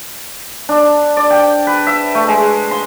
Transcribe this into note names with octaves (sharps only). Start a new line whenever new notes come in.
D4
D5
G5
B4
E5
A3
G#3
C6